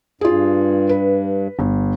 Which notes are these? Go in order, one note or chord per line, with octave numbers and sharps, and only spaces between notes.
G2 F4 G#4
B4
G1